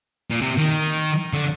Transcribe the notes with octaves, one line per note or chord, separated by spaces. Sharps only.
A#2
C3
D#3
D3